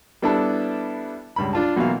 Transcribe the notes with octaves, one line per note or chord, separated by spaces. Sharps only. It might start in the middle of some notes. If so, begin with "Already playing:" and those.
G3 B3 D4 E4 A4 A5
C#2 G2 B5
D4 F4 A5
B1 B2 E3 A#3 F5